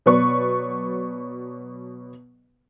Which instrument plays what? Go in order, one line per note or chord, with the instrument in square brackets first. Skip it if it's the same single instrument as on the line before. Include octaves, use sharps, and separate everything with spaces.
[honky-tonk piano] B2 F#3 B4 D5 C#6